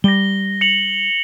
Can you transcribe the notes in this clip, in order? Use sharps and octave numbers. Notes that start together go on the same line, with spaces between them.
G3 A#6 G7
C#7 F7 F#7